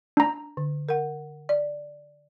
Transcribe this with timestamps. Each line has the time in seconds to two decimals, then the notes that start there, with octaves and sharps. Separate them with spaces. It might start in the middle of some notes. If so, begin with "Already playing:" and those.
0.17 D4 A#5
0.57 D3
0.89 A#4 F#5
1.49 D5